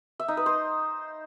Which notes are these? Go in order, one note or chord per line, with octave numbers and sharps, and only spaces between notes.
E5
D#4
B4
C5